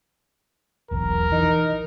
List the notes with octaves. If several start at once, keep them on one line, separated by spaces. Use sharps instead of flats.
E1 B1 E2 A#4
E3 D#4